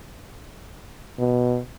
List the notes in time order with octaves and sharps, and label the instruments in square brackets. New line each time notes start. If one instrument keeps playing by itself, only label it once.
[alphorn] B2